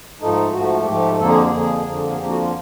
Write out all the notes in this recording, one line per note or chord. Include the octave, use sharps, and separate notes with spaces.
G#2 F3 A3 D#4
G#2 F3 A3 F#4
G#2 F3 A3 G4
F2 D3 F3 A#3 A4
G#4
G4
G#4
F2 D3 F3 A#3
F2 D3 F3 A#3
G#4
F2 D3 F3 A#3 G4
F#4
F4